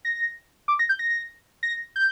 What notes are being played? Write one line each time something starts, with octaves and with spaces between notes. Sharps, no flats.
A#6
D6
A#6
G6
A#6
A#6
G6